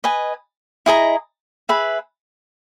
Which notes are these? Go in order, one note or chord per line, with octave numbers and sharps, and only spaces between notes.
B4 D#5 G#5
E4 G#4 D#5 A#5
G#4 B4 E5 B5